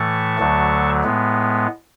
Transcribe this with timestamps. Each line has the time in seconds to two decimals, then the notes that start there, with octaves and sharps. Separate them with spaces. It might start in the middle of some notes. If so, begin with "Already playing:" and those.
Already playing: A2 E3 A3 A5 C#6
0.39 D2 D3 F#3 A3
1.03 A2 G#3 B3